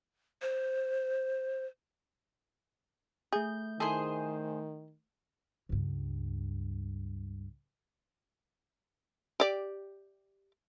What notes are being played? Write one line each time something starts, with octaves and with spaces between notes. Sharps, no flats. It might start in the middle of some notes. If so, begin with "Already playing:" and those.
C5
A3 G#4 G6
D#3 E4 G#4 A4 C5
C#2 G2
G4 D5